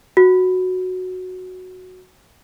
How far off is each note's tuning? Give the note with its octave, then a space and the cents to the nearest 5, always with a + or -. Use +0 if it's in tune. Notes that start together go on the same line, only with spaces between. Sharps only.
F#4 -5